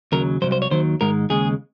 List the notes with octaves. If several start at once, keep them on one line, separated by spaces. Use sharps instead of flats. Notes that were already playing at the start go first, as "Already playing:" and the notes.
D#2 C#3 F#3 A#4
C2 C3 F#3 C5
C5
C#5
D#2 D#3 F#3 C5
G#2 D#3 G#3 A#4
D#2 C#3 G#3 G#4